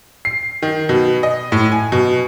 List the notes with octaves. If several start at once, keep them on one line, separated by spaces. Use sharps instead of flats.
C7
D#3
B2
D#5
A2
G#5
B2